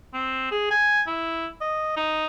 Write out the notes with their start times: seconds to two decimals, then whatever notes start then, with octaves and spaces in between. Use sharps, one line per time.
0.14 C4
0.51 G#4
0.71 G#5
1.07 E4
1.61 D#5
1.97 D#4